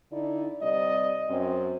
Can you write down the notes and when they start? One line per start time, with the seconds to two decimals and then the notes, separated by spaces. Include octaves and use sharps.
0.12 D3 D#4 E4 D5
0.62 C3 G3 D5 D#5
1.29 F#2 C4